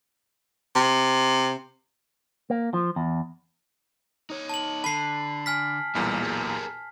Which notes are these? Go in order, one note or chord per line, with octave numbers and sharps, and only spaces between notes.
C3
A#3
F3
E2
D#4 C#5
A5 F#7
D3 A5 B5 C7
G#5 F6 B6
B1 E2 A#2 F#3 G3 A#3
G4 G#4 A#4